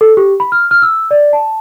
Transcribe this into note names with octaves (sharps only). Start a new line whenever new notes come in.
A4
G4
B5
F6
F6
E6
D5
A5